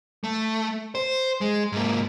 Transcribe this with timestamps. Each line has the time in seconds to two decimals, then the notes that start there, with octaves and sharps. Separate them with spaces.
0.24 A3
0.95 C5
1.41 G#3
1.72 G#2 A#3